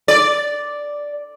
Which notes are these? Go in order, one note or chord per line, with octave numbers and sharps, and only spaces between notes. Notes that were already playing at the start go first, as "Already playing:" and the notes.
D5